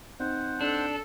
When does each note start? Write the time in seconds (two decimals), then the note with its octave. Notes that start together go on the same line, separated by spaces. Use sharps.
0.20 C4 D#4 C5 F#5
0.61 D4 A4